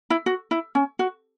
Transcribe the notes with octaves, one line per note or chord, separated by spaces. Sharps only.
E4
F#4
E4
C#4
F#4